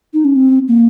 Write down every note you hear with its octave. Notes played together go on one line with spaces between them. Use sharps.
D#4
C#4
C4
A#3